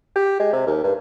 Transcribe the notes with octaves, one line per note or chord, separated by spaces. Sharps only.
G4
G#3
C3
D#2
G2